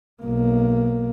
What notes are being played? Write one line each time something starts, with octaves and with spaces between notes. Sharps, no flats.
B1 A#3